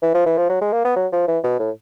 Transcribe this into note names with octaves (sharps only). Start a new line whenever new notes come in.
E3
F3
E3
F3
F#3
G#3
A#3
B3
F#3
F3
E3
B2
A2